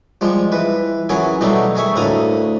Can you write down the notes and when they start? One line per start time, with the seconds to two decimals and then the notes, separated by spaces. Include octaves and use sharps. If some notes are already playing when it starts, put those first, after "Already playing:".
0.21 F3 G3 G#3
0.52 E3 B4
1.09 E3 F#3 C#4 G#4 A#4
1.41 B2 F#3 G3 A3 D#4
1.75 D#3 G#4 E5 C#6
1.96 D2 A2 A#3 A#5 D#6